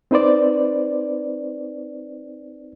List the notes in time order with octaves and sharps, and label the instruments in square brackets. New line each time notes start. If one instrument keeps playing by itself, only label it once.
[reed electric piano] C4 D#4 B4 C5 D5